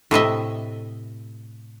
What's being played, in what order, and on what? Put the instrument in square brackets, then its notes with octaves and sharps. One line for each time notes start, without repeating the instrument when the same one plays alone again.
[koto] A2 C3 D#5 E5